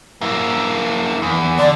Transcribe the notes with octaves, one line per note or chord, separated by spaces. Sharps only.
A#3 E4
E2
D3 D5